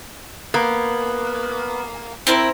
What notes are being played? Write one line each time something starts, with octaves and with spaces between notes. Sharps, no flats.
A#3 B3
C4 E4 A#4